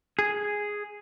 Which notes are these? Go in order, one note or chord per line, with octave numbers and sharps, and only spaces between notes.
G#4